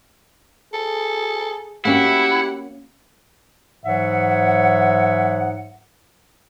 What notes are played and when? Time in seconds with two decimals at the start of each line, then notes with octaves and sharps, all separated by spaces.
0.74 G#4 A4
1.85 A#3 C#4 E4 F#4 G4 F#5
3.85 G#2 E3 F#3 C#5 E5 F#5